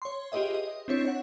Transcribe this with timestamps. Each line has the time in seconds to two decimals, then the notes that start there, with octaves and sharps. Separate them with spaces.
0.02 C#5 C6
0.32 F4 G4 G#4 B4 D#5 E5
0.54 D#5
0.88 C4 D4 E4 C#5
1.05 C#5 F#5